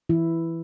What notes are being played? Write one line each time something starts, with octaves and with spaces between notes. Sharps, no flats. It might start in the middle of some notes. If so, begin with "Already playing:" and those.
E3 E4